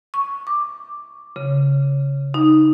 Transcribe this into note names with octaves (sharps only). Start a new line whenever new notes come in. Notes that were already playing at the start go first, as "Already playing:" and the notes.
C#6
D6
C#3
D#4